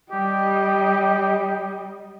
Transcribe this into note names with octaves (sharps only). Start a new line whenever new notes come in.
G3 G4 D#5